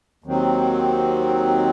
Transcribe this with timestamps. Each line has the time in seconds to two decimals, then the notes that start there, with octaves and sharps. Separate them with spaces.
0.24 D#2 D#3 F#3 C4